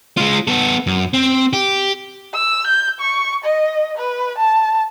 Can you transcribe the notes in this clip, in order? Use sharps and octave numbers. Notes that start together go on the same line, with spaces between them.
G#3 F4
B3 A4
F#2
C4
G4
E6
G6
C#6
D#5
B4
A5